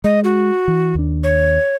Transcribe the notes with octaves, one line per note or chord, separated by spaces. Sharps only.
G#3 D#5
F#4
E3
D#2 D4
C#5